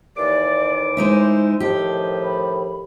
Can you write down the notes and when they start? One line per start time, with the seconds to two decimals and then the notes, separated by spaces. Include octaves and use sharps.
0.17 D#2 E3 D5 D6
0.97 G#3 D#4 E4 C5
1.60 A2 D#3 F3 G4
2.22 B5